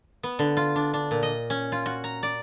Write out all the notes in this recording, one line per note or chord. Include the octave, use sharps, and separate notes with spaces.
B3
D3
F4
D4
D4
A#2
D#5
C#4
F4
F#4
A#5
D5